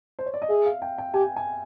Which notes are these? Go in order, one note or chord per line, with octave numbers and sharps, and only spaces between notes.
C5
C#5
D5
D#5
G#4 E5
F5
G5
G5
G4 G#5
G#5